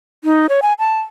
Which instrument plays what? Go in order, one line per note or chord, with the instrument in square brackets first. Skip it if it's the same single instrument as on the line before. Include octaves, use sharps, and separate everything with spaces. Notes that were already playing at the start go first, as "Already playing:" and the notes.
[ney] D#4
C#5
G#5
A5